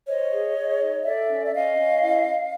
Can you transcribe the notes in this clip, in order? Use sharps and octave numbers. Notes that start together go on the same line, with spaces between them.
C5 C#5 D#5
G#4
G#4
D#4
A4 D5 E5
C#4
E5
C#4 D#5 F5
C#4
E4